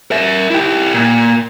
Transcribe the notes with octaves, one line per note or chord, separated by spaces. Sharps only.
A#4 E5
E4 G4
A#2